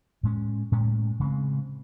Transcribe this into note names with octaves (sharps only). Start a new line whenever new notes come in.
A2 G#3 C#4
A2 G#3 C#4
C#3 G#3 C4